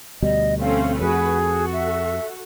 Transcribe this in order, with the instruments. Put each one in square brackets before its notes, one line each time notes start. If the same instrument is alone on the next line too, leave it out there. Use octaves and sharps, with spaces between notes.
[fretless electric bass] D2 B2 G3 [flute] D#5
[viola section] A3 C4 C#4 [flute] F5
[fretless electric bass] F2 [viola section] F#4 B4 [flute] G#4
[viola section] F#4 A4
[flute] E5